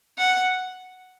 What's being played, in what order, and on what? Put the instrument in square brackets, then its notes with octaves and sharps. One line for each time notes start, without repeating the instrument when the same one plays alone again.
[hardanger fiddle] F#5